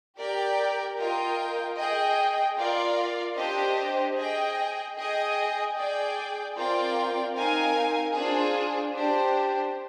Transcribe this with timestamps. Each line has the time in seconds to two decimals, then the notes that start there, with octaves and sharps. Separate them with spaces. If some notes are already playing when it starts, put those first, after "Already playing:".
0.18 G4 A#4 D5 G5
0.98 F4 A#4 D#5 G5
1.77 G#4 D#5 G5
2.57 F4 A#4 D5 F5
3.36 D4 G4 C5 D#5
4.16 G#4 D#5 G5
4.96 G#4 D#5 G5
5.76 G#4 D5 G5
6.56 C4 F4 A#4 D5 G5
7.35 C4 D#4 A#4 F5 G#5
8.14 D4 F4 G#4 C5
8.94 D4 G4 C5